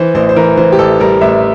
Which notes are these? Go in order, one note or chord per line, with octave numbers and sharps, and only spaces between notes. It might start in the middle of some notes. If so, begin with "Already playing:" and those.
Already playing: E3 C5
A1 C5
C5
E3 A#4
E3 C5
G4
A1 A4
G3 A#4
A1 E5